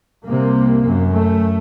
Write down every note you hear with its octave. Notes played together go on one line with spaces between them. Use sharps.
C2 C3 A#3
F#2
A3